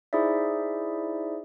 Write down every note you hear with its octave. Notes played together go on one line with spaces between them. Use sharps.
D#4 E4 G#4 C5 D5 E5